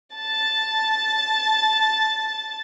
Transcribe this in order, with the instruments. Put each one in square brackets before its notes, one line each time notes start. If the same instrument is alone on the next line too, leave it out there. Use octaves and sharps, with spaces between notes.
[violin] A5 A6